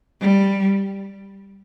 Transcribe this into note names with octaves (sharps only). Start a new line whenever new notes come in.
G3